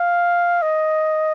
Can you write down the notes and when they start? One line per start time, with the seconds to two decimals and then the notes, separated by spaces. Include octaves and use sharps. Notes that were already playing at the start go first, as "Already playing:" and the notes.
Already playing: F5
0.62 D#5